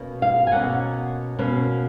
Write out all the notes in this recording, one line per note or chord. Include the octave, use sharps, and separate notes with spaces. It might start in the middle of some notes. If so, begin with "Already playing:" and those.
Already playing: B2 A#3 C#4
F5
G#5
B2 A#3 C#4 F#5
B2 A#3 C#4